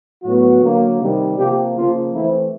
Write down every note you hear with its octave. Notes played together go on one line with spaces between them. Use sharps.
A2 F#3 B3 F#4
D3 F#3 A#3
C3 D#3 G3
C3 F3 A#3 G4
C#3 F3 A#3 F4
E3 A3 C4 E4